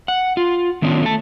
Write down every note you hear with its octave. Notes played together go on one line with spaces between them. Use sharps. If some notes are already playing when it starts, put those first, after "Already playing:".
F#5
F4
D#3 B3 C#4 D4 E4 F4
A3 A5